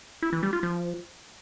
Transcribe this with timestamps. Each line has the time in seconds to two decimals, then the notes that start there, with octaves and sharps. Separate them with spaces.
0.22 E4
0.33 E3
0.43 G3
0.53 F4
0.63 F3